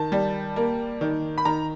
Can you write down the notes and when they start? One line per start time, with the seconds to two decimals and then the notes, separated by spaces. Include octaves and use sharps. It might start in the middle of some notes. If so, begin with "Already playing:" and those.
Already playing: D#3 A5
0.12 G3
0.56 A#3
1.01 D#3
1.38 B5
1.45 D#3 A#5